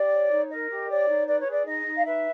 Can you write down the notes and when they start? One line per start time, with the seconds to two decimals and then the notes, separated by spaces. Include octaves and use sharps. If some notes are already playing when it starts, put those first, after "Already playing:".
Already playing: G4 D5
0.12 C#5
0.32 D#4
0.51 A#4 D#5
0.70 G4
0.89 C#5 D5
1.08 D#4
1.27 B4 D5
1.40 C#5
1.46 G#4 D5
1.66 D#4 D#5
1.86 D#4
1.93 F5
2.04 B4 E5